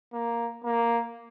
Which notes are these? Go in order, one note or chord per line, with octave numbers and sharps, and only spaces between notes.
A#3
A#3